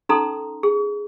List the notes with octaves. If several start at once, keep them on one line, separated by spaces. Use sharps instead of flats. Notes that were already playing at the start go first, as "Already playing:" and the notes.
C#4 D#4 A4 A#5 C6 D#6
G#4